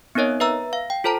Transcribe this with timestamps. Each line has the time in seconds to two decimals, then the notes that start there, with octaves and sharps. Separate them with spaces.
0.15 B3 C4 D#4 A#4 C#5 D#5
0.40 B4 E5 A#5 E6
0.73 F5
0.90 G5
1.04 F4 A4 C5 A5 A#5